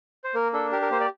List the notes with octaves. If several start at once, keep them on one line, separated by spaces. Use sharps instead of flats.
C5
A#3 A#4
D4 A4
G4 A#4
A#4
A#3 C5
D5